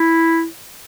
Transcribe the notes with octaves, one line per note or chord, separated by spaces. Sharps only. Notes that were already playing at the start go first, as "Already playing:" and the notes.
Already playing: E4